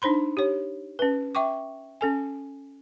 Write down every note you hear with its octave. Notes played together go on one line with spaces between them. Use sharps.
D4 D#4 C5 B5 C6
G4 C#5
C#4 B4
E5 G5 C#6 D6
C#4 A4 G#5